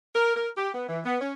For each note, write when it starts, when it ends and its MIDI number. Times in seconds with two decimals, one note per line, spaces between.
0.15 0.36 70
0.36 0.49 70
0.57 0.69 67
0.74 0.85 59
0.88 1.01 52
1.05 1.18 59
1.21 1.34 61